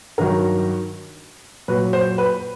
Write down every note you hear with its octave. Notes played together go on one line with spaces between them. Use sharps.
G2 D#3 F#3 A#4
A#2 F#3 B4
C5
B4